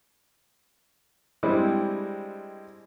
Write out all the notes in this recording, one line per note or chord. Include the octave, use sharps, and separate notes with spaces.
G3 G#3 C4 D4 E4